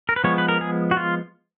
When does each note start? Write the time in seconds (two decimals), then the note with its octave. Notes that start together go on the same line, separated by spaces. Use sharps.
0.09 A#4
0.16 B4
0.24 F3 G#3 B3 C#5
0.38 B4
0.48 A#4
0.61 G#4
0.91 F#4
0.97 F4